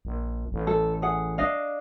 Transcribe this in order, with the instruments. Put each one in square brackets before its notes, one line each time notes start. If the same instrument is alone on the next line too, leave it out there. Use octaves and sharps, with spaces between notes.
[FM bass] A#1
A1
[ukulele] A4
G#4 F#5
D4 D#5 F5